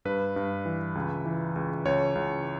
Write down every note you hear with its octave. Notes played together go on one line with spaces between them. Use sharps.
G2 B4
G2
E3
C#2
E3
C#2
C#2 C#5
C#2